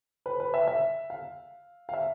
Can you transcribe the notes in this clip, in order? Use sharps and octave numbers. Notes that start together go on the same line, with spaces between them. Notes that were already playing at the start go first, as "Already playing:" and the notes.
B4
B4
E5
E5
F5
F5
E5